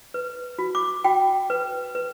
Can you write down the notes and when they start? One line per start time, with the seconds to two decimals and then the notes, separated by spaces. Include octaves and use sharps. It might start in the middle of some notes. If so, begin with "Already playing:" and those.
0.14 B4
0.59 F#4
0.75 D6
1.04 F#4 G5
1.50 B4
1.95 B4